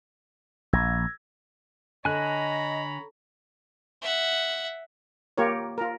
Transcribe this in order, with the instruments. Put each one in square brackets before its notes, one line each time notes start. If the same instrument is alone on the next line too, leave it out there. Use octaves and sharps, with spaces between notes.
[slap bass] A#1 [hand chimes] E6 G#6 A#6
[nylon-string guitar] D3 [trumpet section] C#5 A#5 B5 [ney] D#5 [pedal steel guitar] G#5 F#6
[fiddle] E5 F#5
[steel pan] A#3 F4 G4 A#4 C#5
F4 A#4